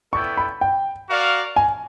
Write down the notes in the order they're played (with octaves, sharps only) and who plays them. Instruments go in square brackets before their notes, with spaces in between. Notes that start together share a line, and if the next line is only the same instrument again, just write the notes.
[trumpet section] B3 E4 A4 D5 G5 [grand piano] C#6
[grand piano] B5
G5
[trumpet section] F#4 A#4 D5 F5
[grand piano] G#5